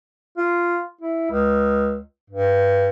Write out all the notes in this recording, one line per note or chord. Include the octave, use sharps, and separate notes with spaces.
F4
E4
C#2
G2